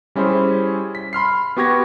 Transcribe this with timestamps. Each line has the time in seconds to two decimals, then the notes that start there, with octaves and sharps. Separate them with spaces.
0.15 G3 C#4 E4 G#4 C5
0.95 B6
1.13 B5 C6 F6 C7
1.57 B3 F#4 G4 C#6 G#6 A#6